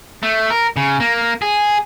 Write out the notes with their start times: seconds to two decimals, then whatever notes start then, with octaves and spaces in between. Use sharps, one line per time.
0.23 A3
0.50 A#4
0.77 C#3
1.00 A#3
1.42 G#4